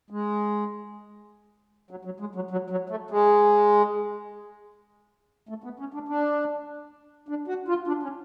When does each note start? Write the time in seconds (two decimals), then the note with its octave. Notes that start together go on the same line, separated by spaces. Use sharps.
0.10 G#3
1.91 F#3
2.05 F#3
2.20 G#3
2.35 F#3
2.51 F#3
2.70 F#3
2.90 A3
3.10 G#3
5.49 A3
5.64 B3
5.79 C#4
5.94 D4
6.09 D4
7.29 D4
7.48 F#4
7.68 F4
7.87 D4
8.03 C#4